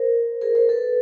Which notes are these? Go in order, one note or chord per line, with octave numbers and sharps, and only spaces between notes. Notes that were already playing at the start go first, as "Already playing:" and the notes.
Already playing: A#4 C5
G#4 A#4
A#4 C5
A4 B4